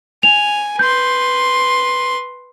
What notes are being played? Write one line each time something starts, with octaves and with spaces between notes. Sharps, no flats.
G#5 F7
B4 C6 G6